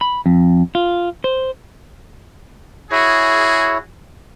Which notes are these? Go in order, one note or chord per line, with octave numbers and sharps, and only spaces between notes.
B5
F2
F4
C5
E4 F#4 G#4 C#5